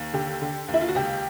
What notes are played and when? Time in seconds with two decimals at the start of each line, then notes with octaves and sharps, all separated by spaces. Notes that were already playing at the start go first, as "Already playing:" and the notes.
Already playing: D#2
0.13 D3 G4
0.42 D3
0.68 D#2
0.74 E4
0.81 F4
0.88 F#4
0.95 C#2 G4